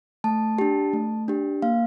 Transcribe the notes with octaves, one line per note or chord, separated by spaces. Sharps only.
A3 A5
D4 G4
A3
D4 G4
A#3 F5